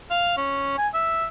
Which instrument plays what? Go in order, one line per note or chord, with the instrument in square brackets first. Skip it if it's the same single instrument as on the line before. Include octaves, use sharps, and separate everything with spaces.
[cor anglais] F5
C#4
G#5
E5